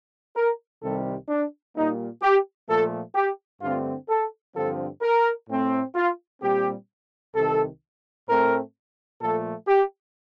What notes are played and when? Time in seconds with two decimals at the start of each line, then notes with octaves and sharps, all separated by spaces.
0.36 A#4
0.82 C2 C3 D#3 G3 A4
1.29 D4
1.75 A#2 G3 A#3 D#4
2.22 G4
2.69 A#2 F3 A3 A4
3.15 G4
3.62 G2 D3 A3 C4 F4
4.09 A4
4.55 G2 D3 F3 C4 A4
5.02 A#4
5.49 A2 A3 C4
5.95 F4
6.41 A#2 G3 C4 G4
7.35 C2 C3 D#3 A4
8.27 A2 A3 C4 A#4
9.21 A#2 F3 A3 A4
9.68 G4